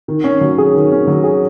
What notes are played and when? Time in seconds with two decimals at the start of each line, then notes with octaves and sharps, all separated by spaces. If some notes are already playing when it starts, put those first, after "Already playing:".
0.08 D#3
0.24 C#4
0.41 F#3
0.58 G#4
0.74 D#3
0.92 C#4
1.07 F#3
1.24 G#4